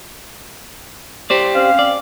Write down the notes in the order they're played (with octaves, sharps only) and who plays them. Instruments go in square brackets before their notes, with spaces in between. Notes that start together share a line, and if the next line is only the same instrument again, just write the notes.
[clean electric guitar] G4 C5 D5
[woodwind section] C4 C#4 F5
[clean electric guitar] D5